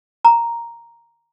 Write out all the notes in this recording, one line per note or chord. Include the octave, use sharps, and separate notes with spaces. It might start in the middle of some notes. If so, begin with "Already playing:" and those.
A#5